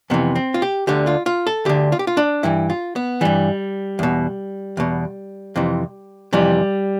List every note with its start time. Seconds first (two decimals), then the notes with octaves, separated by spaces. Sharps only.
0.10 F2 C3 E3 B3
0.35 C4
0.54 F4
0.62 G4
0.87 D2 D3 G4
1.07 F4
1.26 F4
1.47 A4
1.65 D2 D3 G4
1.92 F4
1.99 G4
2.07 F4
2.17 D4
2.43 G2 E3 E4
2.70 F4
2.96 B3
3.21 G2 E3 G3
3.99 E2 B2
4.77 E2 B2
5.56 F2 C3 E3
6.33 F2 C3 E3 G3